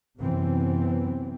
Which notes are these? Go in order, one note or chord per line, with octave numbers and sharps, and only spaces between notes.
F#2 C3 E3 B3 C4